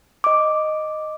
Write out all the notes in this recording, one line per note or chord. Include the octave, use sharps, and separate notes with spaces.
D#5 D6